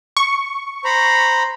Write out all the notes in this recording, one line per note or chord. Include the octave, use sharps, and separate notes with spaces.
C#6
C5 A#5 B5